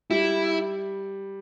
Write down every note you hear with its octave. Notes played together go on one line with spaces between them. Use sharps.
G3 E4